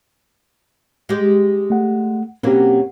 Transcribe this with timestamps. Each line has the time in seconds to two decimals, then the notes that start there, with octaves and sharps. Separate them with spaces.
1.09 G#3 G4
1.70 A3 F#5
2.43 B2 F#3 A#3 C4 C#4 G4